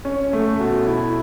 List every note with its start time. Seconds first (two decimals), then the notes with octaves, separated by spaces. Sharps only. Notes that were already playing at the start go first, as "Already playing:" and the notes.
0.05 C#4
0.33 A3
0.60 B2
0.87 E4